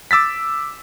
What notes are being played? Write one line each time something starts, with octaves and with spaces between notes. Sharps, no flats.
D6 E6 A6 B6